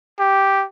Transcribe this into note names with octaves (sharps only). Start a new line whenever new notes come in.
G4